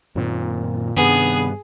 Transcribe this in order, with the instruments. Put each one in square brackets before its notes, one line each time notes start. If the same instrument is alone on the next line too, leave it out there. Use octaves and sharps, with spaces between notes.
[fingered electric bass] F#2 D#3 C4 [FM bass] A#2
[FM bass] G2 [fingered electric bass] C3 D#3 [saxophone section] B3 [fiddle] G#4